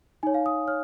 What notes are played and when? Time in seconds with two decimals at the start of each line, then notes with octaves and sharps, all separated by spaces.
0.23 D#4 C#5 G#5
0.34 F5
0.46 D#6
0.67 C#5 F6